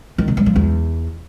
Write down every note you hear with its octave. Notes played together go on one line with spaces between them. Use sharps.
D#3
C3
G2
F3
E2